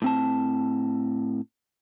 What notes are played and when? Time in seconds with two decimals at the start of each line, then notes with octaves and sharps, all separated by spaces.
0.02 A2 C4 A5